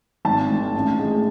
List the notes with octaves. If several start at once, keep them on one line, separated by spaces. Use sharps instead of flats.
G#1 A5
G#2 D#3
A1
A2 G#3